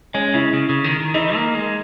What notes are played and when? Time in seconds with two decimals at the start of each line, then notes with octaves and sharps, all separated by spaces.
0.14 G#3 C#4
0.34 C#3 E4
0.54 C#3
0.69 C#3
0.84 D#3
1.00 D#3
1.14 E3 D#4
1.35 A#3
1.55 G#3